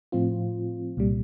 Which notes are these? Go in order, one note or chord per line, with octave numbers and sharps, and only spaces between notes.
A2 F3 C4 F4
C2 A#2 G3